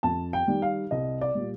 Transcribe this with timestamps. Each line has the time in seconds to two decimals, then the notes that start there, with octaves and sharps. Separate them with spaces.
0.03 F2 A5
0.33 G5
0.48 D#3 G3
0.62 F5
0.91 C2 D#5
1.21 D5
1.35 A#2 G3